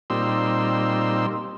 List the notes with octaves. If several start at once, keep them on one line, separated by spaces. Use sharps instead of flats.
A#2 G3 C4 D#4 C6 E6